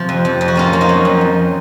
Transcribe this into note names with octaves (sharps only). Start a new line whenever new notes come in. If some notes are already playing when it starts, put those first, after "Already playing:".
Already playing: C3 F3
F2
F2
F2
F#4
A#3 C#4 F4
A#3
D#4 F#4
F#3
F2
F2